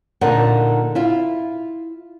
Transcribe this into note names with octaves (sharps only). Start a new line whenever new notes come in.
A#2 D3 D#4 A#4 D5 F#5
E4 F4